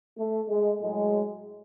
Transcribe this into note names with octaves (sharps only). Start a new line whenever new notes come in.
A3
G#3
A2 F#3 G#3